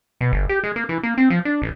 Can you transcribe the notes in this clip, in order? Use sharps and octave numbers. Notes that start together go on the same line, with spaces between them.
B2
G1
G4
G#3
A#3
E3
A#3
C4
F3
D4
A1